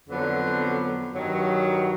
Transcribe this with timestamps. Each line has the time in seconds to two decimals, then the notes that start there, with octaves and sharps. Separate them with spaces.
0.07 F2 D3 F#3 B3
1.12 G2 D#3 F#3